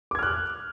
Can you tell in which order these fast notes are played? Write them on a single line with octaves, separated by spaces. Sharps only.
D6 G#6 F6 F#6